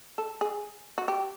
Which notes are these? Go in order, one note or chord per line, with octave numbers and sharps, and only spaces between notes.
A4
G#4
F#4
G4